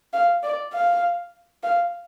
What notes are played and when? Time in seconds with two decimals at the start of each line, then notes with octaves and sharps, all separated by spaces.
0.13 F5
0.43 D5
0.73 F5
1.63 F5